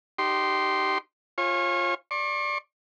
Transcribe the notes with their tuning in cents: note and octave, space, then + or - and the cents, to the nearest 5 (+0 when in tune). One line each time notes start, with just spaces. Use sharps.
D#4 -25 G4 -25 C6 +0
F4 +0 C#5 -35 G#5 -15
D5 +0 C#6 -45